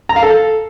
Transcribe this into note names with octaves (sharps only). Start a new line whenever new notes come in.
A#5
F5
A4